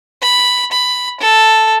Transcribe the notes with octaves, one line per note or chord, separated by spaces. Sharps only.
B5
B5
A4